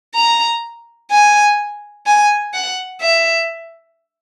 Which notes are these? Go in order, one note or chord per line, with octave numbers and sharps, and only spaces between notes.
A#5
G#5
G#5
F#5
E5